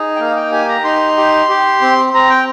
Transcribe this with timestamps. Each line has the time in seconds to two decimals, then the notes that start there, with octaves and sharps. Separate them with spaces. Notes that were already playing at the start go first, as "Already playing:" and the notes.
Already playing: D#4 G#4
0.16 G5
0.19 A#3 F5
0.36 G5
0.52 G4 G#5
0.69 A#5
0.84 D#4 C6
1.17 G4
1.49 G4
1.81 C4
2.14 C4 A#5
2.30 G5